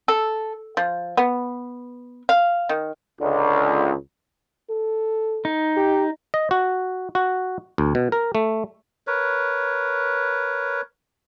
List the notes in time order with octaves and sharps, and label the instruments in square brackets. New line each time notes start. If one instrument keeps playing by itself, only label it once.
[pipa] A4
F3
B3
F5
D#3
[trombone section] C#2 [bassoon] D3
[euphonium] A4
[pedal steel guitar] D#4
[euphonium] G4
[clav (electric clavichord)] D#5
F#4
F#4
D2
B2
A#4
A3
[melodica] A#4 B4 C#5